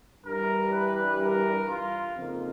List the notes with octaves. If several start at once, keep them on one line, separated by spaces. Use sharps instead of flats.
G2 E3 G3 A#4
B4
A#4
F4
F2 C#3 F3 A#3 D#4